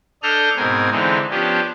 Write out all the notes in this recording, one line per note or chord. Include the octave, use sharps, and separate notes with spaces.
D4 A4 D#5 F6 G6
G#2 B2 C4 A#4 G#5
D3 E3 G#3 C4 D#4
F3 B3 C#4 D4 G4